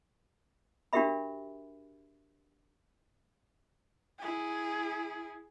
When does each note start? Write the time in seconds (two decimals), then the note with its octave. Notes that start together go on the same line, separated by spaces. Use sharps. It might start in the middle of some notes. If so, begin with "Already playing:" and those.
0.93 D4 F#4 G4 A#4 E5 B5
4.19 E4 G#4